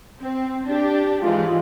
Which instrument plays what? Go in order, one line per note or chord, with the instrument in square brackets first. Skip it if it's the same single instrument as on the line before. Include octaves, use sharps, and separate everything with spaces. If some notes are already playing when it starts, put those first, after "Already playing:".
[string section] C4
D4 G4
[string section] G#2 E3 [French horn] F4